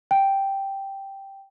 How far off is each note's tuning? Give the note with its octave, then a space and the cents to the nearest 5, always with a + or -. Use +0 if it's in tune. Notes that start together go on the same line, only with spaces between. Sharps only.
G5 +0